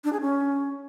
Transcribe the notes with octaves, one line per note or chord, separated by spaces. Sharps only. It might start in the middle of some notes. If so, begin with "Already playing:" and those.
D4
G#4
C#4